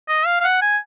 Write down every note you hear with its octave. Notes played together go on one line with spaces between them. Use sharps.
D#5
F5
F5
F#5
G#5